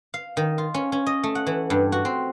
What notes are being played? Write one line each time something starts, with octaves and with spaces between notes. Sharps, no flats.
F5
D#3
F4
C#4
C#4
D#5
A3
F#5
E3
G2
F#4
C4